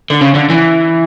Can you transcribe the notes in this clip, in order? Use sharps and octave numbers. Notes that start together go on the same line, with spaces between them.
D3
C#3
D3
E3